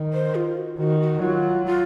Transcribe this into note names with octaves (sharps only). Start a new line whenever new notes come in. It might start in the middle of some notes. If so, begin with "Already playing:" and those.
Already playing: D#3
C5
F4
F#4
D#3 F#4
F#4
F#3 F4
F4